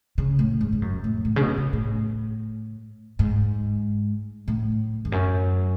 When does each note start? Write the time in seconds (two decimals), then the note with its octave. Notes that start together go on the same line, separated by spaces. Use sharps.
0.18 C#3
0.39 A2
0.61 G#2
0.72 G#2
0.82 F#2
1.04 A2
1.25 A2
1.36 C#3
1.41 B2
1.58 C#3
1.73 A2
3.19 G#2
4.48 A2
5.05 E2
5.12 F#2